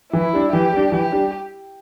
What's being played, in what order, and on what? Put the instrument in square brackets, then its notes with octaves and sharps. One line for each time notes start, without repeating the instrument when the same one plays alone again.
[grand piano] E3 [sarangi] E4
[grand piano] G3 D4
[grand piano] E3 [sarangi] G4
[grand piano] G3 D4
[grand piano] E3 [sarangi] G4
[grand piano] G3 D4